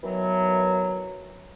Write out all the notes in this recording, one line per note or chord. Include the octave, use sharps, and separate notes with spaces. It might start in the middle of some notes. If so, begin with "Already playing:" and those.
B2 D#3 E3 F#3